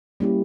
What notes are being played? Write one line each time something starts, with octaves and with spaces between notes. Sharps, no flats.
G3 A#3 C#4 E4 G4